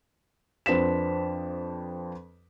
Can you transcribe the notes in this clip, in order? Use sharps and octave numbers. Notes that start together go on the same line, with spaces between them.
F2 D4 B4 C5 B6 E7